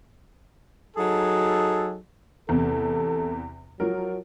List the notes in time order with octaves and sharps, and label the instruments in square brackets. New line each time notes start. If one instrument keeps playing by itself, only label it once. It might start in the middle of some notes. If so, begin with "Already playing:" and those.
[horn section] F#3 D#4 G#4 A4
[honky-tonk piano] E2 C3 [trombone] A4
[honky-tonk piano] F3 A#4 [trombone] F#3